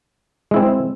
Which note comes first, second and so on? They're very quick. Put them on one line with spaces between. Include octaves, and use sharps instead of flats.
G#3 E4 C4